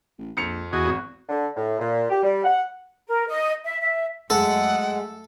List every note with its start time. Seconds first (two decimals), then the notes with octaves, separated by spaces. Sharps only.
0.18 A1
0.37 A#1 F2 C#7 F7
0.73 E2 B2 F#4 G#4 D#5
0.85 G#1
1.29 D3
1.56 A2
1.79 A#2
2.09 G4
2.23 G3
2.44 F#5
3.07 A#4
3.27 D#5
3.64 E5
3.80 E5
4.30 F#2 G#3 A3 A4 F#5